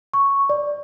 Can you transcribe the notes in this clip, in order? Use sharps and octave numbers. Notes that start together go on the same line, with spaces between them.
C#6
D5